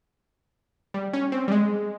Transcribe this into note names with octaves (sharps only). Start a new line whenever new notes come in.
G3
C#4
C4
G3
G#3